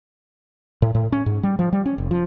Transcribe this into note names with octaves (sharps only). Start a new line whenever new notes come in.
A2
A2
C#4
G#2
G3
F3
G3
C#4
F1
F3